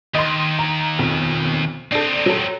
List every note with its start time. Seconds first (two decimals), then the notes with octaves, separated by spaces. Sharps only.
0.15 D#2 D#5 C6
0.59 A#5
0.99 B1 F2
1.92 C4 D4 D#4 A4
2.26 F#3 A4